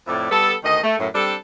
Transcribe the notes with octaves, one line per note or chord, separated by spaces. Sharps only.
F2 A2 A3 E4 D5
G3 B3 A4
D2 D#3 D#5
A3
F#2 A2
G3 C4 D4 A4